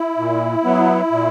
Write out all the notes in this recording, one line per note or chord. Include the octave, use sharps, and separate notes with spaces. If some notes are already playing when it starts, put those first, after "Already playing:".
Already playing: E4
A#2
F#3 B3
A#2